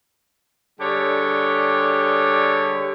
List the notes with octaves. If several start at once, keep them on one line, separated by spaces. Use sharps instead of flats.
D3 G3 G4 G#4 C#5